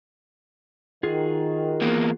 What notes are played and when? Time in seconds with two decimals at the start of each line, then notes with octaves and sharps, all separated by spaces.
1.03 D#3 F4 F#4 G#4
1.81 E2 A#3